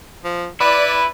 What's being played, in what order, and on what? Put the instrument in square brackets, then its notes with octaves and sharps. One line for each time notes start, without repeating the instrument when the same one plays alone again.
[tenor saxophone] F3
[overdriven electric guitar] E4 [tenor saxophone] B4 [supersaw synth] D5